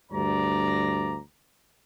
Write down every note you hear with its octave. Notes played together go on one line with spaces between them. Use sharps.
D2 G2 D5 A#5